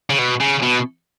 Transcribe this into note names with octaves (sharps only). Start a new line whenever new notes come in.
C#3
B2
C#3
B2